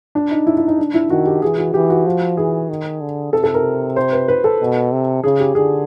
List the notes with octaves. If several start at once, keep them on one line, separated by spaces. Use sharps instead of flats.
D4
D#4
E4
E4
D#4
D4
E4
D#3 F#4
G4
E3 G#4
F#4
E3 G4
F#4
F3
E3 G#4
D#3
D3
C3 A4
A4
A#4
C5
B4
B4
A4
B2
C3
C#3 G#4
G4
D3 G#4